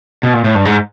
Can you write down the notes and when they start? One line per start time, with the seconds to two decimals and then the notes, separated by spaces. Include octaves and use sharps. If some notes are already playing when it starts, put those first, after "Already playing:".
0.23 B2
0.33 A#2
0.44 A2
0.55 G2
0.65 G#2